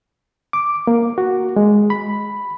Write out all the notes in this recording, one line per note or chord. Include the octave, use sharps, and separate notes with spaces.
D6
A#3
F#4
G#3
B5